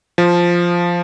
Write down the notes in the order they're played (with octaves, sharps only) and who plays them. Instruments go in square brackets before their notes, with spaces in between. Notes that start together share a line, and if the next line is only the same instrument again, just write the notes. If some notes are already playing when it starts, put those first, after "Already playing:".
[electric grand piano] F3